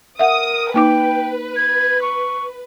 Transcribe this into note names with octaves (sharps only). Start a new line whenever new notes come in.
A#4 E5 F#5 D#6
A#3 D#4 B4 G5 D6
G#6
C#6